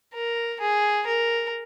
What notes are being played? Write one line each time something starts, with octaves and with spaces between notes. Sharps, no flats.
A#4
G#4
A#4